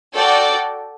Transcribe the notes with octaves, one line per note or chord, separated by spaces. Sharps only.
F#4 A4 D5 G5